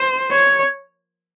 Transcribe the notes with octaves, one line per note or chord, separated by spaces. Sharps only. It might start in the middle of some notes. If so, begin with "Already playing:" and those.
Already playing: C5
C#5